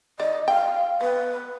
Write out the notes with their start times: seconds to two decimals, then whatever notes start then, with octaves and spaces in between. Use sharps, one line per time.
0.20 D#3 D5 D#5
0.48 F5 G5
1.01 B3 B4